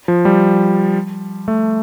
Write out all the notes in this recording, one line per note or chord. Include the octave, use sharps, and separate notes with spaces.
F3
G3
A3